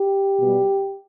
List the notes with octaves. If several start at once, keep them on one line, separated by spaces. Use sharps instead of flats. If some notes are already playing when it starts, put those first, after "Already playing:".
Already playing: G4
B2 G3